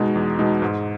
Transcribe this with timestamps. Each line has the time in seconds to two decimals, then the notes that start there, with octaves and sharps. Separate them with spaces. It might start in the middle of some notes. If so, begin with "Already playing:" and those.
Already playing: B2 G#3 D#4
0.15 E2
0.39 B2 G#3 D#4
0.62 G#2